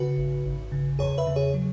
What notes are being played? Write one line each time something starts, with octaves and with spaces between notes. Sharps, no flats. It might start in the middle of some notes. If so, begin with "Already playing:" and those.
Already playing: C#3 F#4 B4
G#1
G#1
C#3
E2 G#4 C#5
B4 E5
C#3
G#4 C#5
F#3